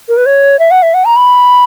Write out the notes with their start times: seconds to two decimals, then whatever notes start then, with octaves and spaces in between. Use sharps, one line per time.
0.08 A#4
0.17 B4
0.26 C#5
0.59 E5
0.71 F#5
0.82 E5
0.94 F#5
1.05 A#5
1.16 B5